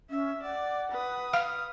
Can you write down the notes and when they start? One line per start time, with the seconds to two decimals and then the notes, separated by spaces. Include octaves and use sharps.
0.10 C#4 E5
0.43 D5 F#5
0.91 B4 D#6
1.33 F5 F6